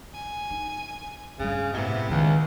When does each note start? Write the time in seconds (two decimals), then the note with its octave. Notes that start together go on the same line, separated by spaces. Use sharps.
0.13 G#5
0.50 D#4
1.39 G2 C#3 G3
1.72 A2 C3 B3 E4
2.10 C#2 D#3 F3